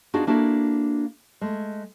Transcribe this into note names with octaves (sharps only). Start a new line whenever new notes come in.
B3 D4 D#4 F4 F#4 G#4
A#3 D4 E4 F#4 A4
G#3 A3